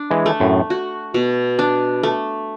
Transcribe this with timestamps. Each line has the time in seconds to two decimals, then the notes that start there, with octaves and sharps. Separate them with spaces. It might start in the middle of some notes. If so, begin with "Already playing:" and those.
Already playing: D4
0.10 E3 G#3
0.26 A3
0.40 F#2 A2
0.70 F#4
1.14 B2
1.59 D4
2.03 A3